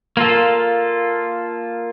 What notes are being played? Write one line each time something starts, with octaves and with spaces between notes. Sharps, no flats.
A#3 F4 A4